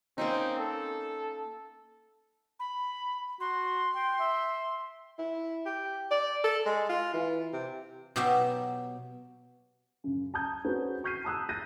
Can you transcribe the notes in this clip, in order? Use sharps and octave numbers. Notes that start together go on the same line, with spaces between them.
A#3 C4 C#4 D#4
A4
B5
F#4 C6
G5
E5
E4
G4
D5
A4
G#3
F4
E3
C3
B2 F#3 D#4 G4 E5 G5
F#2 C#3
A5 A#5 D#6 G6
C4 C#4 F#4 G#4 A4 B4
C#6 F6 G6 B6 C7 D#7
A5 A#5 D#6 E6 F#6
F#6 G6 A6 A#6 D#7